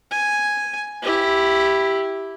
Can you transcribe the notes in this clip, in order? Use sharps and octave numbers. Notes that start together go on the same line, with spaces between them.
G#5
E4 G4